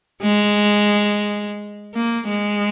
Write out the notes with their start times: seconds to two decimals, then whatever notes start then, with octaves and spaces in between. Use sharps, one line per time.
0.22 G#3
1.95 A#3
2.29 G#3